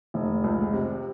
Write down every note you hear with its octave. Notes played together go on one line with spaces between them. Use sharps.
F1
C#2
C3